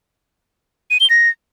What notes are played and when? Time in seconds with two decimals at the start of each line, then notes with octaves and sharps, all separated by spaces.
0.90 D#7
1.00 G7
1.10 A#6